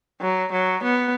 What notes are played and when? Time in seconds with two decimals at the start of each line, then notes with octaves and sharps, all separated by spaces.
0.21 F#3
0.52 F#3
0.83 B3